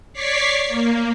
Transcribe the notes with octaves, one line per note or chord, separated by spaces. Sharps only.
C#5 D5 C#6 D6 B6 C7
A#3